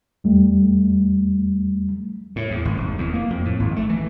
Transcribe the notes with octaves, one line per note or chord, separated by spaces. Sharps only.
E2 G3 A3
A2
E2
G#1
F1
E2
A#3
F2
A2
G#1
A3
E3